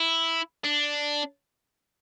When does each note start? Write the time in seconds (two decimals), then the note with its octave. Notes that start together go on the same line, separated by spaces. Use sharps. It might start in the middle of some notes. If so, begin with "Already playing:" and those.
Already playing: E4
0.64 D4